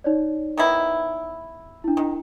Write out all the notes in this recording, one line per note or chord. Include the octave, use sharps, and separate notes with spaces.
D#4 C#5 D5
D#3 B3 E4
D4 E4
D#3